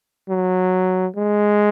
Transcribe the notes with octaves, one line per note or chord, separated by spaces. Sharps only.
F#3
G#3